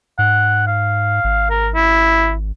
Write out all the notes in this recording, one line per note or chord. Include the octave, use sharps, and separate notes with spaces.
G#2 F#5
F5
G#1
A#4
E4